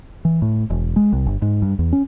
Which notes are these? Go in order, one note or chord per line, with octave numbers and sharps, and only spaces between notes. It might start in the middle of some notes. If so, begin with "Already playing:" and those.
E3
A2
E1
G#3
C2
G1
G#2
G2
E2
C#4